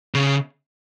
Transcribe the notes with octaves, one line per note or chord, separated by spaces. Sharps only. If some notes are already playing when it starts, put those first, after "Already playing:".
C#3